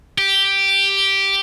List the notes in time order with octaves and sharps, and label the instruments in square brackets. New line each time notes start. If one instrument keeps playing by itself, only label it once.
[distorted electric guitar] G4